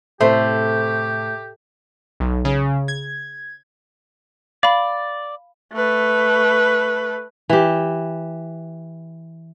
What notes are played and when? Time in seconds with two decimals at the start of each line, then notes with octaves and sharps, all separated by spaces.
0.21 A2 C3 A3 G4 C5 E5
2.20 B1
2.45 C#3
2.88 G#6
4.63 D5 F5 B5
5.73 A3 B4
7.49 E3 G4